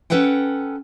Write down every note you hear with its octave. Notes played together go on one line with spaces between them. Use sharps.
C#4 A4 B4 F#5 G5